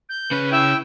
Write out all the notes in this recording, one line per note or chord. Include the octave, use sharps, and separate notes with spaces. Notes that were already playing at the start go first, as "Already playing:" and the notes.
G6
C#3 C#4 B4
E4 E5 G5